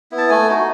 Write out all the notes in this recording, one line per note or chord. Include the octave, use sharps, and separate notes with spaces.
B3 E4
A5
A3 G#5
D#4 F#4